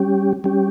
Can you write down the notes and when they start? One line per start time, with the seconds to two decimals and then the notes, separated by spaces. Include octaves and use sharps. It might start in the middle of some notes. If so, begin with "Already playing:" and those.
Already playing: G3 C#4 G4
0.44 G3 C#4 G4